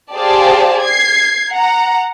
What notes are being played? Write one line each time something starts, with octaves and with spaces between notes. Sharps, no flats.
G4 G#4 C5 D5 F5 A5
G#6 C7
F#5 A#5